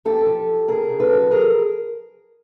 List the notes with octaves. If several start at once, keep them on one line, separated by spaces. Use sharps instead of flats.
F2 G4 A4
F3
F2
C#3 G#4 A#4
C#3
A4 B4
F#3
F3 G#4 A#4